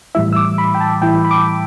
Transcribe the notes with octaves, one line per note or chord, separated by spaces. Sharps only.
A2 E3 G3 E4 E5
E6
D6
B5
G5
A5
A2 E3 G3 E4 G5
B5
D6